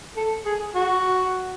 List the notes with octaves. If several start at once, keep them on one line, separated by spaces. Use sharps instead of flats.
A4
G#4
F#4